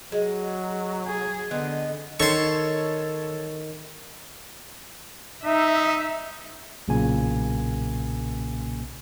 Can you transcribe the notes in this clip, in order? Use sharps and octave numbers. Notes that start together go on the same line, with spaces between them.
F#3 G#3
G#4
D3 B3 C4 D#5
D#3 A4 C#5 C6 C#6 A6
D#4 E5
B1 A#2 C#3 A#3 G#5